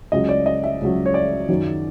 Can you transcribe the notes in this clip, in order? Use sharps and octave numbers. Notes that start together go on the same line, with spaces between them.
C#2 C#3 F#3 D#5
D5
D#5
E5
C#2 C#3 F#3
C#5
D5
F#2 D#3 F#3